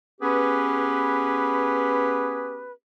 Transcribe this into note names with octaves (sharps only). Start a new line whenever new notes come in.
B3 C#4 G4 G#4 B4